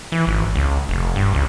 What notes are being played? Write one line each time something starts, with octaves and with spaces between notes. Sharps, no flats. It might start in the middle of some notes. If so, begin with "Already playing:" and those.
E3
G#1
C#2
F1
G2
C#2